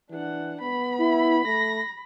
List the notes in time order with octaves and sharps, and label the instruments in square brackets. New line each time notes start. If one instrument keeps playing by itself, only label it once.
[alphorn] E3 [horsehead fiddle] D4 F#5
[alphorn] B3 [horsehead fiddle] B5
[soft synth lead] E4
[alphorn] A3 [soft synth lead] A#6